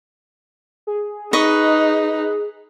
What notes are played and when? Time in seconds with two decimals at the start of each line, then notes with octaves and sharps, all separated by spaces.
0.87 G#4
1.33 D#4 B4 D#5 C#6